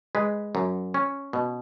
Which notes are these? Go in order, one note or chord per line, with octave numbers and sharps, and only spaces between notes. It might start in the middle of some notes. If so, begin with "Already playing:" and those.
G#3 B4
F#2
C#4
B2